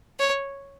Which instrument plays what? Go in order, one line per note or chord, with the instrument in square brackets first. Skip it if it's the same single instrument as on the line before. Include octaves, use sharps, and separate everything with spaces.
[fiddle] C#5